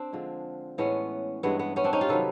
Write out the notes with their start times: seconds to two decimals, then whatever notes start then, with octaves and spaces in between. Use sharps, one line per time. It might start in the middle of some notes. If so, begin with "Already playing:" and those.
Already playing: C4 D4
0.13 D3 F3 G#3
0.78 A2 E3 G#3 B3 C#4
1.43 G2 E3 G#3 B3
1.59 B3
1.76 B3 C#4
1.84 C4 D4
1.93 C#4 D#4
2.01 F4 G4
2.08 C3 D#3 F#3 A4 B4